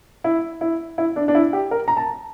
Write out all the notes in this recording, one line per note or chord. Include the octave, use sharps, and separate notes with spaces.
E4
E4
E4
D4
D4
E4
G4
A#4
A#5
A5